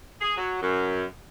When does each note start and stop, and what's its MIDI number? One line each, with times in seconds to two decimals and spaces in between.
0.21 0.34 68
0.37 0.60 54
0.62 1.03 42